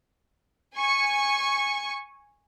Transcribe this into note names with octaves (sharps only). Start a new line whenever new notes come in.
G#5 C#6